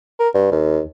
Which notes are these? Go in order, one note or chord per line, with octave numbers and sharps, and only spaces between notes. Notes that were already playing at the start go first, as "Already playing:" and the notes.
A#4
G2
D#2